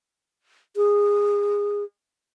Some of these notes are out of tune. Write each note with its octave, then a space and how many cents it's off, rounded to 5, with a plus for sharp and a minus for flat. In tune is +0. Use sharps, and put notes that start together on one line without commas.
G#4 -20